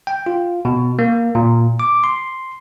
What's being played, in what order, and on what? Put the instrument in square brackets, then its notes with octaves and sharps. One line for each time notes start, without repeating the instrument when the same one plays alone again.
[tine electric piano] G5
F4
B2
A#3
A#2
D6
C6